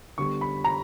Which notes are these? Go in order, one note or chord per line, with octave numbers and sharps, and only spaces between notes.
D3 G3 B3 C#6
B5
A#5